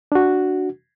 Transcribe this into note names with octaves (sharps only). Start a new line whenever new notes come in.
D4 F#4